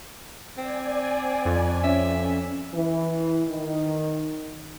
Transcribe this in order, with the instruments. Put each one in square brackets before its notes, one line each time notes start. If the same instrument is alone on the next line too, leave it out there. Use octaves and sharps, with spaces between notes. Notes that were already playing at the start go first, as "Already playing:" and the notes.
[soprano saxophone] C4 [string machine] D5 G#5
[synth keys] F2
[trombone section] C#4 [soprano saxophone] E5
[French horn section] E3
D#3